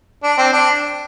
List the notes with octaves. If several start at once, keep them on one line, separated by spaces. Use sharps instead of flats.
D4
C4
D4